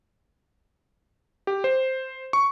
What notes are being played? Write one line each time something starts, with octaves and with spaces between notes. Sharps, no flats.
G4
C5
C#6